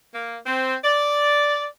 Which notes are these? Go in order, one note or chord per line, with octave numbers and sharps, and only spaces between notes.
A#3
C4
D5